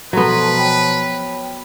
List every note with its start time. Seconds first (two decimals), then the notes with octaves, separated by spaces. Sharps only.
0.13 B2 F3 F#3 B3 A4 B4 A#5 C6
0.57 C#5 G5 B5